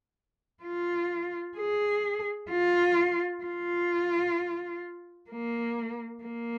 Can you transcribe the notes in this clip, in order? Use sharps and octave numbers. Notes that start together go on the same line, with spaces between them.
F4
G#4
F4
F4
A#3
A#3